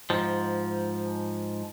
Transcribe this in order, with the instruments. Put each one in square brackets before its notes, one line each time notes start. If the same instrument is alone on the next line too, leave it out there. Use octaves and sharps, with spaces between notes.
[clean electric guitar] G#2 F3